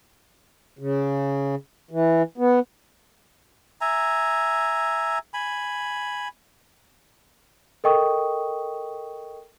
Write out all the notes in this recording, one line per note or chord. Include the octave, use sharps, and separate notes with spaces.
C#3
E3
B3
E5 G#5 A#5
G#5 B5
A4 A#4 D#5 G5 C#6 D#6